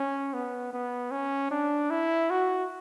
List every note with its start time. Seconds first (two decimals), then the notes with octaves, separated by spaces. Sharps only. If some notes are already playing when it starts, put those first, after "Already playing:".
Already playing: C#4
0.34 B3
0.73 B3
1.11 C#4
1.51 D4
1.90 E4
2.30 F#4